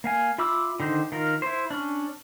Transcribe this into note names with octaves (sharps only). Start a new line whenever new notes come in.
A#3 F5 G#5
F4 E5 B5 D6 E6
D3 D#3 D#4 C5
D#3 F4 A#4
E4 C5
C#4 D4